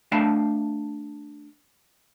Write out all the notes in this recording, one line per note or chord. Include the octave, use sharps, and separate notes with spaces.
A3 D4 F5 G5 A5 B5